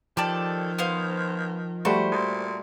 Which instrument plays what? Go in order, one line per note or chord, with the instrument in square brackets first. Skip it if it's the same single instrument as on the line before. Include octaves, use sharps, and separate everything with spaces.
[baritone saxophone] D#3 [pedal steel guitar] F3 [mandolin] G4 A4 D5
[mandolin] B3 C5 F5
[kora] G3 A3 F#4 [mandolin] C5
[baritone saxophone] A#2